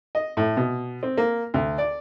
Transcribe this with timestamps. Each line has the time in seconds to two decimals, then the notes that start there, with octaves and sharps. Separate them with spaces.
0.15 D#5
0.37 A2
0.57 B2
1.03 C4
1.17 A#3
1.54 D2
1.78 D5